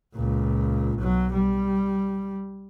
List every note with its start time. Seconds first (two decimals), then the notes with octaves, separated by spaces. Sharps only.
0.15 C#2 A#2
0.98 B1 F#3
1.34 G3